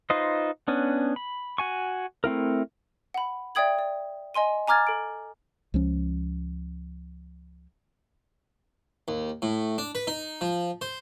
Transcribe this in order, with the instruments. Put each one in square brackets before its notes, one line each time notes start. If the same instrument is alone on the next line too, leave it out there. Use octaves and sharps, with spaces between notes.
[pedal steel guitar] D#4 F4 B4 C5 D#5
B3 C#4 D4
B5
F#4 G#5 C#6
A3 C4 E4 A#4
[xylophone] F#5 B5
D5 E5 G5 D#6 G#6 F#7
D5
D#5 G#5 C6 D#7
G#5 A#5 D6 F6 G#6 A6
A4 D7
[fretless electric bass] C#2 F3 C#4
[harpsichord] D#2
A2
D4
B4
D#4
F3
C5